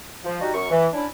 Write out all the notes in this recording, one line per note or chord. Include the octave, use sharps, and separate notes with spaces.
F3
G3 D#4 F#4
F#2 C#6
E3
C#4 D4 E4